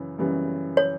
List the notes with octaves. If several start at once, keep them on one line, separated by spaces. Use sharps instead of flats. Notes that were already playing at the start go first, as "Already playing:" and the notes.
Already playing: F#2 C#3 E3
F#2 C#3 E3 G3
C#5